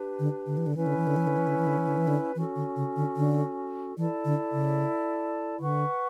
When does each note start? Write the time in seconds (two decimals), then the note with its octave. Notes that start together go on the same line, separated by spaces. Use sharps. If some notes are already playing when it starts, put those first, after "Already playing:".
Already playing: D4 G4 B4
0.19 D3
0.46 D3
0.57 E3
0.67 D3
0.74 E3 C#4 E4 B4
0.86 D3
0.97 E3
1.07 D3
1.16 E3
1.27 D3
1.37 E3
1.47 D3
1.58 E3
1.67 D3
1.77 E3
1.87 D3
1.97 E3
2.08 D3
2.35 E3 C#4 F#4 A4
2.56 D3
2.76 C#3
2.96 D3
3.17 D3
3.97 E3 E4 A4 D5 A5
4.25 D3
4.52 C#3
5.60 D3 B4 F#5 C#6